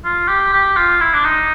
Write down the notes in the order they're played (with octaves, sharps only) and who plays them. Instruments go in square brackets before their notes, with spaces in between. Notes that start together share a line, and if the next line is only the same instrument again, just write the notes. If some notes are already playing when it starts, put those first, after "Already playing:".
[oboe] F4
G4
G4
F4
E4
D4
D#4